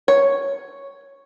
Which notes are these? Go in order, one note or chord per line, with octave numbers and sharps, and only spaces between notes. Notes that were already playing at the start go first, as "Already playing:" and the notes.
C#5